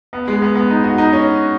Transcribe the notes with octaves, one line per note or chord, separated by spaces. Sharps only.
B3
G#3
B3
B3
D#4
F#4
D#4
C#4